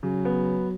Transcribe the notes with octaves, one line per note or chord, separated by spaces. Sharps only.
C#3 F#3
B3